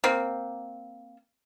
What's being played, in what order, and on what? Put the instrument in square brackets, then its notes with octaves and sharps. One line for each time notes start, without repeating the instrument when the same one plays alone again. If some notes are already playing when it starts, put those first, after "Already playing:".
[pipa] A#3 C4